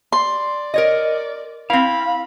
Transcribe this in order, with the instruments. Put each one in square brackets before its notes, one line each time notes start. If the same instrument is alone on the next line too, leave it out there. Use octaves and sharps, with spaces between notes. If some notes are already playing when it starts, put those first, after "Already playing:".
[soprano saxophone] D5 [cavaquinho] C6
[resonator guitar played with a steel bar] A#4 C#5 D#5
[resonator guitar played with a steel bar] C4 E4 [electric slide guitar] F5 [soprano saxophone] B5